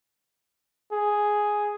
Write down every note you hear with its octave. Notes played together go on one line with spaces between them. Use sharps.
G#4